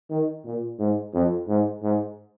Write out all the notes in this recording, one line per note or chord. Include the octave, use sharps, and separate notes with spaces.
D#3
A#2
G#2
F2
G#2
G#2